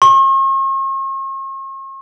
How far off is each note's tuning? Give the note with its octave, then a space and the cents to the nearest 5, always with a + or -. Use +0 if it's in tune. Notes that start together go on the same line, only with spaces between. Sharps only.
C#6 -45